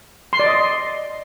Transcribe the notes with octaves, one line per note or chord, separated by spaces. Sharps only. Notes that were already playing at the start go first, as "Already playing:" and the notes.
C6
D5
D#5